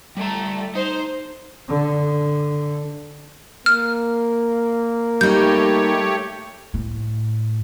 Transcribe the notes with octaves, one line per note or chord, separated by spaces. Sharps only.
G3 A3 A#5
D#4 C5 D#5
D3
A#3 F6
G3 A3 D#4 G4 C#5 G6
A2